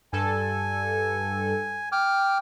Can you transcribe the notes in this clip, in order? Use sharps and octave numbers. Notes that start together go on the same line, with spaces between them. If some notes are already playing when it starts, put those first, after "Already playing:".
G2 A4 G#5
G5 D6 F6